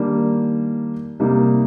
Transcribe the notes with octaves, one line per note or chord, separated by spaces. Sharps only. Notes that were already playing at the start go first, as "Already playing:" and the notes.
Already playing: D#3 G3 A#3 D4
C3 G3 A#3 D#4